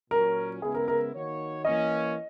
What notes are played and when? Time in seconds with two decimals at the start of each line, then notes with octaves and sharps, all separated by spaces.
0.11 A#2 F#3 C#4 A#4
0.62 C#3 G#3 B3 E4 G#4
0.75 A#4
0.88 A#4
1.13 D#3 A#3 D#4 F#4 C#5
1.65 E3 A#3 C#4 D#5